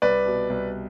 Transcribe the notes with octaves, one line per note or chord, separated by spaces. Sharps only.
C2 B4 D5
B2
C2